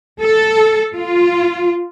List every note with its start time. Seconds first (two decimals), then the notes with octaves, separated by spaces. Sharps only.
0.21 A4
0.95 F4